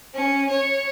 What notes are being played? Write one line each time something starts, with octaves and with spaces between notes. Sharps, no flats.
C#4
C#5